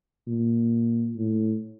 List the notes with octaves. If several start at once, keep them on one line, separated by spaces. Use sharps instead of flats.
A#2
A2